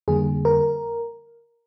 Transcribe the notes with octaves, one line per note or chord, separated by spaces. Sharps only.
F2 D3 G3 A#3 G#4
A#4